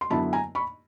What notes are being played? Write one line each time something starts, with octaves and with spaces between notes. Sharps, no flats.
C6
F#2 D3 F#3 B3 E4 A5 B5
G#5 A#5
B5 C#6